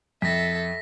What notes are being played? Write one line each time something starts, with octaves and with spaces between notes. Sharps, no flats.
F2 A4 E5 A#6 B6